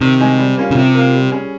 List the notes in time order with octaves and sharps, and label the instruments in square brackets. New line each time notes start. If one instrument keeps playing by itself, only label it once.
[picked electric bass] C3 [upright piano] D#3
[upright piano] G#3 D#4 G#4
G3
A#3 C#4 F4
[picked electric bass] C#3
[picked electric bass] C3 [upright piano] F3
[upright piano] A#3 F4 A#4
G3
C#4 G#4